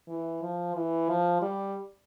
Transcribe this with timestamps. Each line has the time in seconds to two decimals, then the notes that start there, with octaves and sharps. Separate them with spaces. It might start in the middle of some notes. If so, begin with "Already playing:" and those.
0.08 E3
0.42 F3
0.75 E3
1.09 F3
1.42 G3